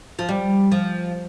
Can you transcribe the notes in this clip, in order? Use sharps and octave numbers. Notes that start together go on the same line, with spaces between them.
F3
G3
F3